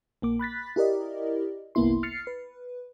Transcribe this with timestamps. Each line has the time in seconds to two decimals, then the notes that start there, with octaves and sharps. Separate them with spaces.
0.22 A#1 A#3 D6
0.39 B5 F#6 A6 B6
0.76 E4 G4 A#4 D5 D#5
1.75 G1 C2 A#3 B3 E4 C6
2.03 F6 A6 C7 C#7
2.27 B4